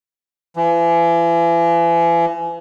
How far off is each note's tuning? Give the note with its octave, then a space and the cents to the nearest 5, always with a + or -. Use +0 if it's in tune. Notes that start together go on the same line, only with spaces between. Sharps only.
E3 +40